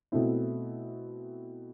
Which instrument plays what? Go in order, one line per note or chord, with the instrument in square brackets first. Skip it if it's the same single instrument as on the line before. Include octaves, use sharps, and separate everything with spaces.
[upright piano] B2 A3 C4 E4